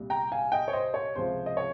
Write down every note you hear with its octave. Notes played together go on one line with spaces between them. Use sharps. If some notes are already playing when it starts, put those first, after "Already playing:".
Already playing: C2 A#2 G3
G5 A#5
F5 G#5
D#5 G5
C#5
C5 D#5
C#5
C#2 C3 F3 C5
D#5
C#5